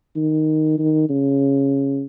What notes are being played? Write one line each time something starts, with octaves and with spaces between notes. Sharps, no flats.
D#3
D#3
C#3